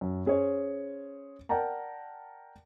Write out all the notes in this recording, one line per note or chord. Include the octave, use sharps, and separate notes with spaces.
F#2
C#4 G#4 C5 C#5
A#4 D5 F#5 G5 A5 A#5